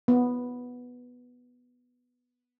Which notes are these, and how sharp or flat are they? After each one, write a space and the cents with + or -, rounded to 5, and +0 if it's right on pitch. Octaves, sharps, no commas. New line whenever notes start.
B3 +0 B4 +0